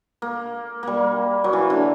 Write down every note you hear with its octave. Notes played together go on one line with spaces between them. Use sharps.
A#3
G3 A#3
F#3
E3
D3